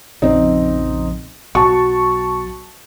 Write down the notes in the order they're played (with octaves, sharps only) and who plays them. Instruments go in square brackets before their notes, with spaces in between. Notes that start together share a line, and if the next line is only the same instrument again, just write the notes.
[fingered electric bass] A#1 F2 C#3 [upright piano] C4 [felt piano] D#4
[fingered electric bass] B1 [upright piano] F#4 [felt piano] A5 C#6